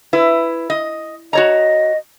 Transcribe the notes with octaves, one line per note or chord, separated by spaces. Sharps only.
E4 B4
D#5
F#4 C#5 D#5 A#5